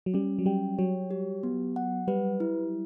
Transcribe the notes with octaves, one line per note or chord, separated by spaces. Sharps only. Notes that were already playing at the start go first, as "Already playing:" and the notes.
F#3
G3 C#4
F#3
G3 G5
F#3 C#5
G4
B3
F#5
G3 B4
E4